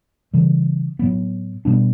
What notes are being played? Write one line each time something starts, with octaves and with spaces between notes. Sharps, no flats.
C#3 E3 G3
A2 F#3 B3
B2 G3 B3 D4